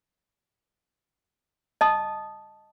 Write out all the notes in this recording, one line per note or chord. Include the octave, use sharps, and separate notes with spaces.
D#5 A5 D#6